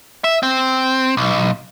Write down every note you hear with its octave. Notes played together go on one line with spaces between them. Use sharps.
E5
C4
B1